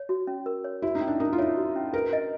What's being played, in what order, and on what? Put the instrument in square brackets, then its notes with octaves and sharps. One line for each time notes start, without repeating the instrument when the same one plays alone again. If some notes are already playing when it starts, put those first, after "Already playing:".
Already playing: [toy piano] C#5
F#4
C#4
A#4
C#5
[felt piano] E4 [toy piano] F#4
[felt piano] D#4
[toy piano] C#4
[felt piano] D4
[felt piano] D#4 [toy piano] A#4
[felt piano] F4
[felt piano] E4 [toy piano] C#5
[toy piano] F#4
C#4
[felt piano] A#4 [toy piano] B4
[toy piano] D#5